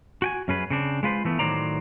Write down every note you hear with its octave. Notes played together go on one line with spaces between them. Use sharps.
F#4 G5 G#5
F#2 C#4 G#4 B4
C#3 C4 D4
G#3 F4 B4 C5
E3 A3 B3
A2 D#3 F#3 C5 D5 A#5